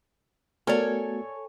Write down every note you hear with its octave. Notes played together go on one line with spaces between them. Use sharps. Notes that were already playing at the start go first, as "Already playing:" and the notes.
A3 B3 F#4 A4 A#4 C#5 D5 G#5